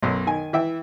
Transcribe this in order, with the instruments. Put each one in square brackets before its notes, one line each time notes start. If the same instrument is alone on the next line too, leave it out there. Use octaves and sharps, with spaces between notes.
[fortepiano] B1 F#2
D#3 G#5
E3 E5 G5